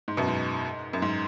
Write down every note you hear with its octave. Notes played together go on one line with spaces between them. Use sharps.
G#2
F#2 B2
G#2
F#2
G#2